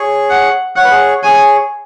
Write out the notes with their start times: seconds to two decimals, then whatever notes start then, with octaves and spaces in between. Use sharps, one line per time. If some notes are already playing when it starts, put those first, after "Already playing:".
Already playing: G#4 C#5
0.30 F#5
0.76 C#5 F#5
0.84 B4
0.91 G#4 C#5
1.23 G#4 C#5 G#5